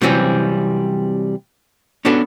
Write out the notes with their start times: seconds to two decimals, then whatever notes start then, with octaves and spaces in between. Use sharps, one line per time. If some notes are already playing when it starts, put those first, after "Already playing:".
0.01 C3 E3 F#3 G3 C4 C#4
2.05 B3 C#4 D4 F#4 A4